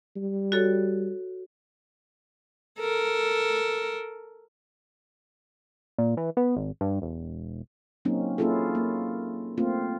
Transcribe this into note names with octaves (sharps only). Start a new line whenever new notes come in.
G3
F#4 A4 C#5
A4 A#4
A#2
E3
B3
G#1
G2
E1
F#3 A#3 C4 C#4 D#4
A#3 C#4 E4 F4 G#4 A4
A#3
A3 A#3 C4 F4